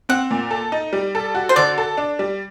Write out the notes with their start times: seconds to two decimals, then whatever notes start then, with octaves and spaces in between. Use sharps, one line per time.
0.09 C4 F#5
0.31 A#2
0.51 A4
0.72 D#4
0.93 G3
1.15 A4
1.35 F#4
1.49 C5
1.56 D3 D5
1.78 A4
1.97 D4
2.19 G3